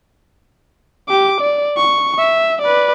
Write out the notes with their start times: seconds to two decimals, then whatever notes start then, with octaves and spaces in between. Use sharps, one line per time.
1.08 G4 D6
1.41 D5
1.77 C#6
2.19 E5
2.62 B4 D5